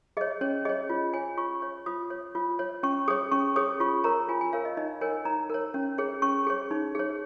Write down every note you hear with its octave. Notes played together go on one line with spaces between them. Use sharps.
G#4 C#5 D#5
C#4 C#5
G#4 C#5 D#5
F4
C#5 G#5
F4 C#6
C#5
F4 D#6
C#5
F4
C#5
C#4 C#6
G#4 C#5 D#6
C#4 C#6
G#4 C#5 D#6
F4 C#6
A#4 C#5 A#5
F4 G#5
G#5
A#4 C#5 F5
D#5
D#4 D#5
A#4 C#5 G#5
D#4 A#5
A#4 C#5
C#4
G#4 C#5
C#4 C#6
G#4 C#5
D#4
G#4 C#5